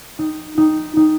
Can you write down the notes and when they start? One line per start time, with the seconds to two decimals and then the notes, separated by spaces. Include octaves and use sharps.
0.19 D#4
0.58 D#4
0.97 D#4